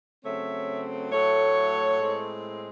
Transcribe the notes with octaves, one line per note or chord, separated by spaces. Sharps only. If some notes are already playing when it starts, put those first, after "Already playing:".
C#3 F#3 A3 C4 C#5 E5
A2 F#3 A3 A4 C#5
A2 G#3 C4